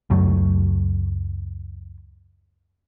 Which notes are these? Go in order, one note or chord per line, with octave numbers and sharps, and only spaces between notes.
C#2 F#2 F#3 A3